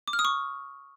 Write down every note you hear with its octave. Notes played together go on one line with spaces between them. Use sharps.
D6
F6
D#6
C#6